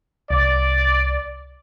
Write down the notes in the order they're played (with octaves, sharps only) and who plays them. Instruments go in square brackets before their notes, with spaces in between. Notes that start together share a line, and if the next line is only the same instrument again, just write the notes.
[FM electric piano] C2 [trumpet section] D5